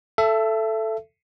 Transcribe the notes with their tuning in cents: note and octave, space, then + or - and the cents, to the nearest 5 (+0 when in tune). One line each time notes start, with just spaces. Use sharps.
A4 +0 E5 +25